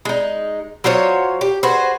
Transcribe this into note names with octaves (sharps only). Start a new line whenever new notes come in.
G#3 D#4
F#3 F4 C5 C#5
G4
F#4 G#4 B4 C5